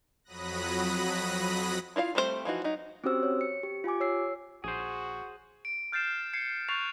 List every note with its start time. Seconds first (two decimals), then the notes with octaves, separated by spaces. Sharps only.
0.24 F2 F#3 B5 D#6 F#6 A#6
1.96 E4 F4 D#5 F5
2.15 G3 A3 C4 F4 C5
2.45 E3 F3 D#4 F#4
2.64 F#3 D#4
3.04 C4 C#4 F#4 G4 C5 E6
3.23 C#5
3.41 C#7
3.63 G4
3.84 F4 G4 G#5 D6
4.00 C#5 E6 C7
4.64 A#1 F#4 G#4 C5
5.65 D7
5.92 F6 G6 A6 C7 E7
6.33 G#6 C7 C#7
6.69 C#6 F#6 G6 A6 C7 F7